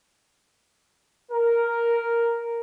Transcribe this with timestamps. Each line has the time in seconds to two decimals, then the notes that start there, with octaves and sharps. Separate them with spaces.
1.31 A#4